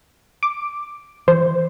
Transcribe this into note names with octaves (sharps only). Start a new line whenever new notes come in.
D6
E3 C5